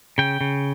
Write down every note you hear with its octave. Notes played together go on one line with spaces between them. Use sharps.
C#3 G5
C#3